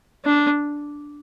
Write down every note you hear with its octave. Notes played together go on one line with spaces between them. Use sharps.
D4